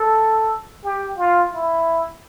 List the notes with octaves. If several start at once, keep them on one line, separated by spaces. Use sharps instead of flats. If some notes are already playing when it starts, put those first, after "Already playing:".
Already playing: A4
G4
F4
E4